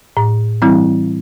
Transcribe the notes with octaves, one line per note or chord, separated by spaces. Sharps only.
A2
E3 G3 C4 E4